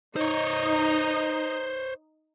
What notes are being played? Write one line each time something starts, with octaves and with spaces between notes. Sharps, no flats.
D#4 C5 C#5